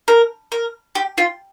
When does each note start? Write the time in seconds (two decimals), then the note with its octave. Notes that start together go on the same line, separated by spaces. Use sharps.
0.08 A#4
0.52 A#4
0.95 G4
1.18 F4